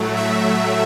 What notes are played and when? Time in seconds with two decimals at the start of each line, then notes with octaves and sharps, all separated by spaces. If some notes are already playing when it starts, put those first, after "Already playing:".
Already playing: A2 F#3 A3
0.17 E5